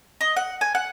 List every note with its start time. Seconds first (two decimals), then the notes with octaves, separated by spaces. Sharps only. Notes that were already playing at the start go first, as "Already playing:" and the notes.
0.21 D#5
0.36 F#5
0.61 G#5
0.75 F#5